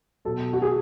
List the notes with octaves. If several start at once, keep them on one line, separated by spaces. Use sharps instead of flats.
B2 F#3 A4
F#4
G#4